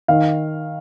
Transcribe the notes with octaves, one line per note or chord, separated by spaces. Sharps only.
D#3 F5